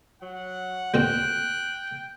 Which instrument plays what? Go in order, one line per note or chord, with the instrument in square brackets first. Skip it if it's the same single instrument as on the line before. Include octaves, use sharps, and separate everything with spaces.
[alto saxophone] F#3 [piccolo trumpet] F#5
[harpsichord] D2 A#2 C4 [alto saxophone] G5 [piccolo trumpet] F#6